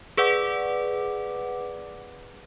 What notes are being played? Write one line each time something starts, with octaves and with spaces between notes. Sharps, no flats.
G#4 B4 D5 F#5 D6